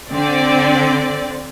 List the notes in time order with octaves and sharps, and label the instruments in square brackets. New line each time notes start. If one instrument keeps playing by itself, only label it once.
[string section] D3 C4 D5